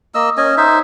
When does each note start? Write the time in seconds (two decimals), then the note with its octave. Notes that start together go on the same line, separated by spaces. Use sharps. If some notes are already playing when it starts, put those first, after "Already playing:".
0.15 A#3 D#5 E6
0.37 C#4 D#5 G#5
0.57 D#4 C5 E5